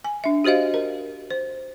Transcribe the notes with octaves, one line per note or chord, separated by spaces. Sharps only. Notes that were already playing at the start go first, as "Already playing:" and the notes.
G#5
D4 E5
F#4 G4 C5 D#5 F5
A#4
C5